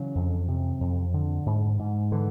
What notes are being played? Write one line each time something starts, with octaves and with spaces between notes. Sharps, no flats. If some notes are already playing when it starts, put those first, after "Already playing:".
Already playing: C#3 E3 F#3
F2
C3
F2
D3
G#2
G#2
D3 E3